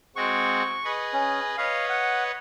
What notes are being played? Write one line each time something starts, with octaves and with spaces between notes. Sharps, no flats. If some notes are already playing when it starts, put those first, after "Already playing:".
G#3 C4 F#4 C#6
G#4 B4 D#5
C#4
B4 C#5 D#5 F5
F#5